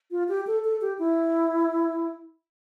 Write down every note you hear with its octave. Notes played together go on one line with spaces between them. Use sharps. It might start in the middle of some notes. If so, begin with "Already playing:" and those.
F4
G4
A4
A4
G4
E4